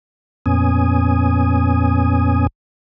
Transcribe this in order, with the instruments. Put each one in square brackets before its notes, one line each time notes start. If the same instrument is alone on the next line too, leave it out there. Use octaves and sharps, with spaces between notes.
[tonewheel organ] F2 A#2 B3 C#4 G#5 D#6